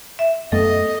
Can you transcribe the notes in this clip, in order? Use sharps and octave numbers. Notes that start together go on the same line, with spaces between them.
E5
F#2 A3 B3 A4 D#5